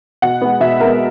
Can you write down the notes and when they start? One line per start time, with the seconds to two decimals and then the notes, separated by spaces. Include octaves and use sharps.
0.22 B2 F#5
0.41 G#3 B3
0.60 B2 E5
0.80 G#3 B3 A#4